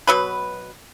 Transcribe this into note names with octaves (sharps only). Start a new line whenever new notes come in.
B2 F#3 B4